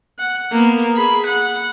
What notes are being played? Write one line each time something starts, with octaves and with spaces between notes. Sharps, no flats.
F#5
A#3 B3
G#4 B5
F#5